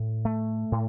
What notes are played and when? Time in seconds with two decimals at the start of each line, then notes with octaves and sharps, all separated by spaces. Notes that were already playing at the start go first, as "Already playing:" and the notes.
Already playing: A2
0.25 A3
0.72 A2